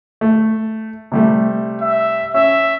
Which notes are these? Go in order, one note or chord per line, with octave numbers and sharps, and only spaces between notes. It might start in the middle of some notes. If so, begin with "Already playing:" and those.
A3
C3 G3 A3
E5
C#4 E5